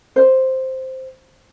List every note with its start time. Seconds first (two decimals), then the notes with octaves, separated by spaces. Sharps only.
0.16 C5